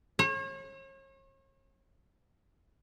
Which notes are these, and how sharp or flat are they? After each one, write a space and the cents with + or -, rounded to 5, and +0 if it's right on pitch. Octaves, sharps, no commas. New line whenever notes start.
C#5 -40